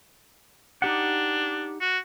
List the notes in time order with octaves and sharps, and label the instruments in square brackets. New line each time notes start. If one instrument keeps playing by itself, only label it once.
[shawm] D4 [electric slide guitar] D#4 G4 F#5
[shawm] F#4